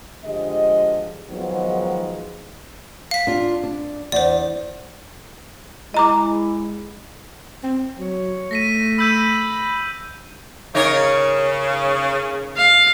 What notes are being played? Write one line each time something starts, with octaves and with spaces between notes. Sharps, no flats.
D3 F3 G#3 G4 D#5
D#3 F3 F#3 G#3 B3 D#4
F5 B6
D4 F4
D4
E2 C5 D5
G#3 E4 D#5 A#5 D6
C4
F#3 C#5
A3 A#6 B6 D#7
B5 E6 G6 D#7
C#3 D#4 A#4 C#5
F5